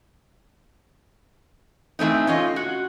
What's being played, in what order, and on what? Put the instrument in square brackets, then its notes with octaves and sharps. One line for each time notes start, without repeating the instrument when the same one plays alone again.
[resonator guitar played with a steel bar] E3 A3 C4 D#4
C#4 F4 D#5
F#4